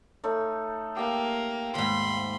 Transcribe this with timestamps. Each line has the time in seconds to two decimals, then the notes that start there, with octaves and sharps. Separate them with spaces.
0.24 A3 D#4 C#5
0.97 A#3 G4 F5 G5
1.75 D#2 G#2 B5 C6